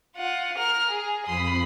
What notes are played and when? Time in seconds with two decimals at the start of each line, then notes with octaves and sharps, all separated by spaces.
0.16 F4 F#5
0.57 A#4 F6
0.89 G#4
1.26 F2 B5 C6 D#6